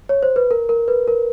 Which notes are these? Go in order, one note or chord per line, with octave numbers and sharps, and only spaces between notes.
C#5
C5
B4
A#4
A#4
B4
A#4